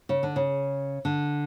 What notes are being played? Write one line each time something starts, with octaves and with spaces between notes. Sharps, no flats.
C#3
D3
C#3
D3